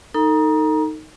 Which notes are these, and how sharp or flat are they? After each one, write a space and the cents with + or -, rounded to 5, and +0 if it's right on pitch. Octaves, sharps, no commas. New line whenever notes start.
D#4 +0 A4 +35 A#5 +25